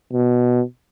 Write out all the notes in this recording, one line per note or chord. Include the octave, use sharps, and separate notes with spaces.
B2